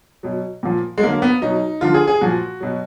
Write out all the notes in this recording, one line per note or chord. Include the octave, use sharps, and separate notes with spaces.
B2 F#3
A#2 F3
G#3
D3 F#3 A#3
A#3
B3
B2 F#3 D#4
D3 F3 F4
G#4
G#4
A#2 F3 F#4
B2 F#3